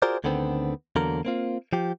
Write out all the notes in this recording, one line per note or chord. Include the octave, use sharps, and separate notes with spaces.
F4 F#4 G#4 A#4 C5 D5
D2 D3 D#3 B3 C4
E2 D3 F#3 A#3 A#4 A#5
A#3 C4 F4
F3 G4